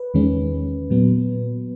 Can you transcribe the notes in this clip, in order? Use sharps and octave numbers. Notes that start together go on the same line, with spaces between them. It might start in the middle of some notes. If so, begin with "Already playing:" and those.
Already playing: B4
E2 D#3 G#3 C#4
A#2 F#3 B3